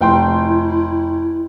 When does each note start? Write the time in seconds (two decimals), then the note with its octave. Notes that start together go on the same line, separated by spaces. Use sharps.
0.01 F1 E4 G5 C6